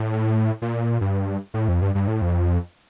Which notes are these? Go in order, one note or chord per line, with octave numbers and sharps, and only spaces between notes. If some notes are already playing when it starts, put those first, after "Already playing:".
Already playing: A2
A#2
G2
A2
F2
G2
G2
A2
F2